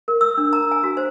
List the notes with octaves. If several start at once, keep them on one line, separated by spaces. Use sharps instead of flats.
A#4
E6
D4
A#5
G#5
F#4
C5